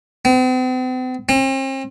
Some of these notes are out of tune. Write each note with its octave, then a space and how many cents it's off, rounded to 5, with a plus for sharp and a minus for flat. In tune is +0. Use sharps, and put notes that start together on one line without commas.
C4 -45
C4 +40